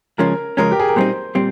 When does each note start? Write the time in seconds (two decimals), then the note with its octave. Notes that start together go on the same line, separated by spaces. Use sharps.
0.18 C#3 F3 G#3 C#4 A#4
0.57 C#3 F3 G#3 C#4 A#4
0.72 G4
0.80 G#4
0.89 A#4
0.96 A#2 G3 C4 D#4 C5
1.35 A#2 G3 C4